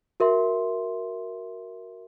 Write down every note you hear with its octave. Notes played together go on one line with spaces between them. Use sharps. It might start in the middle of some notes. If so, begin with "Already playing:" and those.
F#4 A#4 E5 C6